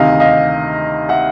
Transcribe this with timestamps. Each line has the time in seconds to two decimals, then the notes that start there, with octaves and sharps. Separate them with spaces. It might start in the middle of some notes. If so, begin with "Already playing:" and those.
Already playing: D2 C3 D#3 D#5 F5
0.20 D#5 F5
1.09 E5 F#5